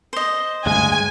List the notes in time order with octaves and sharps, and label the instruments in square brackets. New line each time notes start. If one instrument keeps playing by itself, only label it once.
[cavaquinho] C5 D#5
[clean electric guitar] D2 G2 G#3 [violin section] G#5